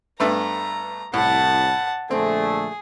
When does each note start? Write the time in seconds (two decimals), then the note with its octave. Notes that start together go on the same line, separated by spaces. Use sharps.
0.20 G2 A3 B3 A#5
1.14 C2 A2 F#5 A5
2.11 A#1 D3 A3 C4 G#4